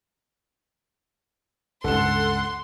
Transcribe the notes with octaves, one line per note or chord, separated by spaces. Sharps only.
C#2 G2 A4 F#5 C6 E7